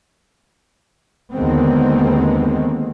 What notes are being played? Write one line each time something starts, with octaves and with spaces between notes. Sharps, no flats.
D#2 D3 D#3 G#3 B3 C4